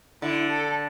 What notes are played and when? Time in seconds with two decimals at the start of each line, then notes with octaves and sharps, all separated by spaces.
0.22 D3 E4
0.50 A4